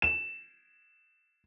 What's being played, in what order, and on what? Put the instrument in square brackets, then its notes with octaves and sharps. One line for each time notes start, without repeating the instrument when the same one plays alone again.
[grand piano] E7